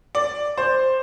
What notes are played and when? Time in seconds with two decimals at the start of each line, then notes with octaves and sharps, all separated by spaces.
0.15 D5
0.57 C5